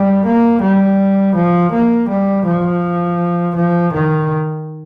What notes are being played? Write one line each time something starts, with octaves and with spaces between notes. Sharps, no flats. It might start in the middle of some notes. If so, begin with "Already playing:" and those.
Already playing: G3
A#3
G3
F3
A#3
G3
F3
F3
D#3